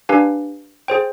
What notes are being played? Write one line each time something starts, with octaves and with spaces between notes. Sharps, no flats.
D4 G4 B4 F5 G#5
G#4 C5 G5